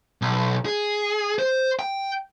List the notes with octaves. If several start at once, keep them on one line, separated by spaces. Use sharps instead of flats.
B1
G#4
C5
G5